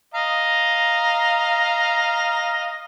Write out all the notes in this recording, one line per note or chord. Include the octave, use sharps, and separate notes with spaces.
D#5 F5 A#5